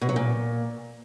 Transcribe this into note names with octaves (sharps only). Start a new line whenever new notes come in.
B2
F#3
A#2